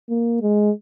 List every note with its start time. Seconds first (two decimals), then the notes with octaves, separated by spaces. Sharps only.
0.09 A#3
0.41 G#3